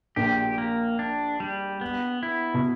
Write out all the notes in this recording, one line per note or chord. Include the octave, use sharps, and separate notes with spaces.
A#1 A#2 G4
A#3
D4
G3
B3
E4
B2